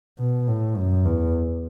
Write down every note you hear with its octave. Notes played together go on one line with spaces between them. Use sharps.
B2
A2
F#2
E2